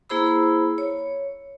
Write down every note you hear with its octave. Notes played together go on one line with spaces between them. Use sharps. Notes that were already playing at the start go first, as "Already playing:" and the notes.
A#3 E4 G#4 C5 B5 E6
C#5